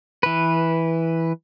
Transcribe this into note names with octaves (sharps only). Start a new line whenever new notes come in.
E3 B4